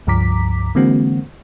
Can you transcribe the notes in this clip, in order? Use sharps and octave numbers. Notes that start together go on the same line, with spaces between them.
C#2 G2 F3 A#5 D6 B6
D3 E3 G#3 A#3 C4 F#4